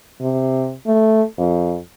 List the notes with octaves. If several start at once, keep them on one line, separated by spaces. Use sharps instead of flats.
C3
A3
F2